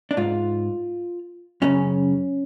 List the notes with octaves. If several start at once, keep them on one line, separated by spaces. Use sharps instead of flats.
D4
G#2 F4
F#2 C#3 C#4